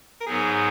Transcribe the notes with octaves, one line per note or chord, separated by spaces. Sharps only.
A#4
G#2 F#3 B3 D#4 G#4